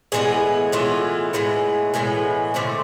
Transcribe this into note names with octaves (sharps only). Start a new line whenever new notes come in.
A2 E3 G#3 B3 G#4
A2 E3 G#3 B3 F4
A2 E3 G#3 B3
A2 E3 G#3 B3
D3 A3 C4 F4